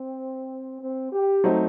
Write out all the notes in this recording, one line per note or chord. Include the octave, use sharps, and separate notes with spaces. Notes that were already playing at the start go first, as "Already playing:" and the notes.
Already playing: C4
C4
G4
F#3 A3 C4 D#4